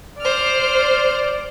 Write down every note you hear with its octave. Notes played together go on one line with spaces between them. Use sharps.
C5 D5 F6